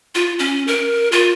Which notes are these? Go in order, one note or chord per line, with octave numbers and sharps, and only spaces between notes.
F4
C#4
A#4
F4